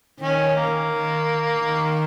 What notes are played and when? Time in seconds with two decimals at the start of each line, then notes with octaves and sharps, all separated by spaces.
0.20 D#3 C#4
0.56 A#3
0.90 D#3
1.60 D#3